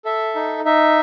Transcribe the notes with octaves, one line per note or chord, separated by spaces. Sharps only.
A4 E5
D#4
D#4 E5